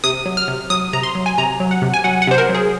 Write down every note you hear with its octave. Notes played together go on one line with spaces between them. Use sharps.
C3 D#6
F#3
F6
C3
F#3 D#6
C3 A#5
C6
F#3
G#5
C3 A#5
F#3
F#5
C3
G#5
F#3 F#5
F#5
C3 C5
A#4
F#3
G#4